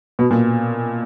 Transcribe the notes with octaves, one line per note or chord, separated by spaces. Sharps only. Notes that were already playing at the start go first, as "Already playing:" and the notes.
B2
A#2